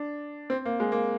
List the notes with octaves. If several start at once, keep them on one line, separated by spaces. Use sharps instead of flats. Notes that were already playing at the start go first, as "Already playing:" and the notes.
Already playing: D4
C4
A#3
G#3
A#3